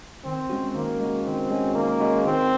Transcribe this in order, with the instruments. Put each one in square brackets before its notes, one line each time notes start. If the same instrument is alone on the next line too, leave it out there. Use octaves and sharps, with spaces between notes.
[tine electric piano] D#3 [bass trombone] C4
[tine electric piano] G#3 C#4 F#4
[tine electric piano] D#3 [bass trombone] A#3
[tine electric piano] G#3 C#4 F#4
[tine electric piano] D#3 [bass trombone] C4
[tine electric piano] G#3 C#4 F#4
[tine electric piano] D#3 [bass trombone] A#3
[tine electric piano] G#3 C#4 F#4
[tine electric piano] D#3 [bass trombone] C4